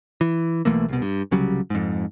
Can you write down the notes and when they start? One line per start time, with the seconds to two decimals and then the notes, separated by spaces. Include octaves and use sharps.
0.21 E3
0.65 B1 E3 A3 A#3
0.88 C2 B2
1.02 G2
1.31 C2 C#3 F#3 G3
1.70 F2 G#2